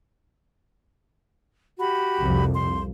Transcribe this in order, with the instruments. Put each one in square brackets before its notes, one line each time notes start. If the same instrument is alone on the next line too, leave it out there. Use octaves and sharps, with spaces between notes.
[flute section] F#4 G4 B5
[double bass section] C2 F2
[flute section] C6